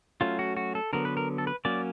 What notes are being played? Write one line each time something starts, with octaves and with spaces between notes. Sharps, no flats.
F#3 A3 C#4 F4
F#4
F#4
A4
D3 F#3 B3 A#4
B4
A#4
A4
B4
F#3 A#3 C#4 D5